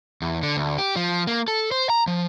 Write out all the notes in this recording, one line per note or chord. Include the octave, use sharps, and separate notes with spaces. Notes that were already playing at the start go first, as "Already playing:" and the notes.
E2
D3
D2
G4
F3
A#3
A4
C5
A#5
F3